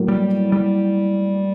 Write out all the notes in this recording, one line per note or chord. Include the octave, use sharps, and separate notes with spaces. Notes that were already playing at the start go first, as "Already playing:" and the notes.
Already playing: A2 F#3 A#3
G3
G3